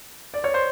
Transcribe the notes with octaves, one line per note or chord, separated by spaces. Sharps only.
D5
C#5
C5